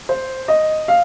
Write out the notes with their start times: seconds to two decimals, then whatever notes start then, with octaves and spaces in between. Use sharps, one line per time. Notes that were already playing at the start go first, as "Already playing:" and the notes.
0.09 C5
0.48 D#5
0.88 F5